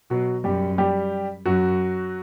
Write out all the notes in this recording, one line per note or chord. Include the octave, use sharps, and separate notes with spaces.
B2 F#3 F#4
F#2 G3 G4
G3 G4
F#2 F#3 F#4